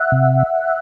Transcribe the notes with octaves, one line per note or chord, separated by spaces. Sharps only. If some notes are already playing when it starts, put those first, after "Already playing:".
Already playing: E5 F#5
C3